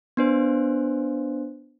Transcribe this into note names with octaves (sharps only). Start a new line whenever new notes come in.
B3 D4 C5